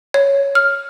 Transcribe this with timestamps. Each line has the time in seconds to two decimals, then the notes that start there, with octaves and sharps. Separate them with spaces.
0.14 C#5
0.55 F6